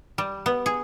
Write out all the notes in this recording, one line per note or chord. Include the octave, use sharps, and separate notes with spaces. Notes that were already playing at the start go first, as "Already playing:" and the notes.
G3
B3
G#4